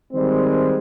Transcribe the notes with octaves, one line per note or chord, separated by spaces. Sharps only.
D#3 G3 G#3 C4